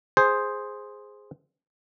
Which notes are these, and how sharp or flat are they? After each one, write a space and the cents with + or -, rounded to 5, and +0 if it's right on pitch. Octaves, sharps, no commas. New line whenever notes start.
G#4 +0 C5 +0